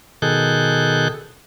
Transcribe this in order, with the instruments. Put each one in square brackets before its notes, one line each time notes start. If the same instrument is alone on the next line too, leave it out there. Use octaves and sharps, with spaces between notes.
[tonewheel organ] B2 D#3 G#4 A4 F#6 G6